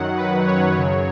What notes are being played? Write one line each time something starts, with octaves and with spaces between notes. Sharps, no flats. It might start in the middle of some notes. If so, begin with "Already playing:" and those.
Already playing: F#2 D#3 F#3 F#5
B4
C#5
F#2 C#3 F#3